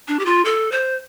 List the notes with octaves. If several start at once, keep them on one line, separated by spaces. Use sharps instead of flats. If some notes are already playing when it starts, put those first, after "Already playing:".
D4
G4
F4
A4
C5